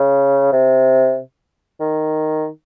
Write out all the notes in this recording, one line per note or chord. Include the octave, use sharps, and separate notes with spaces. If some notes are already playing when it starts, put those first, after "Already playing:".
Already playing: C#3
C3
D#3